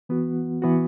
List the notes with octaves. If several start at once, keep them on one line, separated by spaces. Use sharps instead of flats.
E3 B3 F#4
E3 B3 F#4